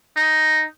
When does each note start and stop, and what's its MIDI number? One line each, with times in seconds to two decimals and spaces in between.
0.17 0.64 63